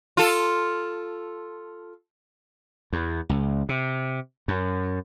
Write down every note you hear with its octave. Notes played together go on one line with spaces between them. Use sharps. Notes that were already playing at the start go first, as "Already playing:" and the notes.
F4 A4
E2
C#2
C3
F#2